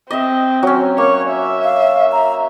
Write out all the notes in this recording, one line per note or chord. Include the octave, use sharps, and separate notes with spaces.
C4 D#5 E5
F#3 C#4
A#3 C#5
E5
F5
A#5